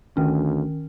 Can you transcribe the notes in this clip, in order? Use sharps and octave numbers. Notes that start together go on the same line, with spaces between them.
D2 D#3 C#4